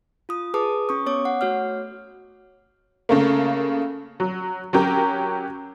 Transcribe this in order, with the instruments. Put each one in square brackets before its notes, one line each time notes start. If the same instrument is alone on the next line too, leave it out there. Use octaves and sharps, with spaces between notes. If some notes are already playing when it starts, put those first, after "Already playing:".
[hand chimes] F4 D#6
G#4 B4 A5 D6 D#6
C#4 C#6 D#6
B3 C#5 D6
F#5
A3 F#4 C#5 F6
[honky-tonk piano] C#3 A3 A#3
F#3
F#3 C#4 G4 A#4